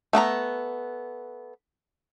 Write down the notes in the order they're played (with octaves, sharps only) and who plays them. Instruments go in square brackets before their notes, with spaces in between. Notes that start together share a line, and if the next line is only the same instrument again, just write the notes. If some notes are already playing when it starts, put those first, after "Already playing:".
[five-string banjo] A3 B3 D5 A#5